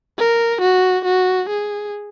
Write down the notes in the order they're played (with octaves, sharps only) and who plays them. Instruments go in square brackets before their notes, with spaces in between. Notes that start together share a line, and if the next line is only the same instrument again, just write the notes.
[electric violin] A#4
F#4
F#4
G#4